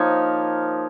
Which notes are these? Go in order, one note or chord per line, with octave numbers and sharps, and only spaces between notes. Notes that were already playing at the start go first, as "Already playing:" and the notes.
Already playing: F3 A#3 D#4 C#5